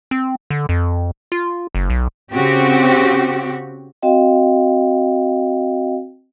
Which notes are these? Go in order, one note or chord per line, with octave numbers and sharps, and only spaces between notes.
C4
D3
F2
F4
F#1
B1
C#3 C4 F#4 G4
C4 F#4 D#5 F5 G5